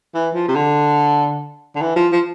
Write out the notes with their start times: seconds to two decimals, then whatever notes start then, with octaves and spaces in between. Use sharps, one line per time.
0.14 E3
0.34 F3
0.48 C3
0.55 D3
1.75 D3
1.81 E3
1.96 F3
2.12 F3